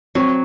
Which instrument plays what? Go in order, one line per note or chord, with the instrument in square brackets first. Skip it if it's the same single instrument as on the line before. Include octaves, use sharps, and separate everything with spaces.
[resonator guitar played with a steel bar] F#3 [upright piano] C4